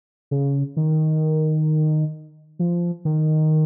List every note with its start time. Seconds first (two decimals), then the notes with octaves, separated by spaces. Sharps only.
0.31 C#3
0.77 D#3
2.59 F3
3.05 D#3